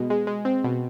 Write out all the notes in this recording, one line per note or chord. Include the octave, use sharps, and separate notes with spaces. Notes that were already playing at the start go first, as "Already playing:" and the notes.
Already playing: B2 G#3
G#3
G#3
C4
B2